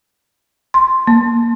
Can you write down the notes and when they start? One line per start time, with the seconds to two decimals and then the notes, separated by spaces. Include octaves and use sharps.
0.74 C6
1.07 A#3